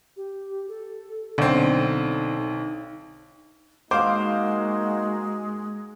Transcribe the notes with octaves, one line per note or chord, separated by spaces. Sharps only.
G4
A4
B1 D3 C4 D#4
G#3 A#3 D#4 F#4 C5 F5 D6